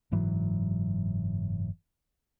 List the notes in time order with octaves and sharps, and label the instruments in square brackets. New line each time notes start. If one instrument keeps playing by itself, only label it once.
[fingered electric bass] F#1 G#2 E3 F#3